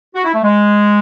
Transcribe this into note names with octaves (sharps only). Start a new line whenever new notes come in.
F#4
E4
A3
G#3